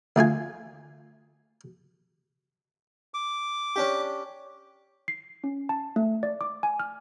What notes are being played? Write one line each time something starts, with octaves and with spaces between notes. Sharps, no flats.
D2 A3 F4 G#5
D6
C#4 D4 G4
C7
C#4
A5
A3
D5
D6
G#5
F6